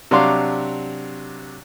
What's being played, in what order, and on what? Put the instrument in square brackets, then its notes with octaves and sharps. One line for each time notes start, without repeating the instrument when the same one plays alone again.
[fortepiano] C3 F#3 D4 F5 C6 D6